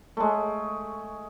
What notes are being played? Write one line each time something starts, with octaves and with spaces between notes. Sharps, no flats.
G#3 A3